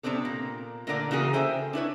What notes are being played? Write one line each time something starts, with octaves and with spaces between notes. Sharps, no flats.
C3 B3 C4 D4 A4
A#2 A#3
A#2 D3 A3 A#4 D5 F#5
C#3 E3 A#3 F#4 G#4 A#4
A4 C5 E5 G5 G#5
D4 E4 B4 C#5